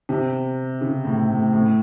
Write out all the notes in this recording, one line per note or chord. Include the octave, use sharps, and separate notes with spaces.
C3
C#3
A2
A2
A2